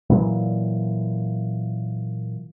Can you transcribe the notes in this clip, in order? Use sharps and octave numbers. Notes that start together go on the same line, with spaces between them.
A#2 E3 F#3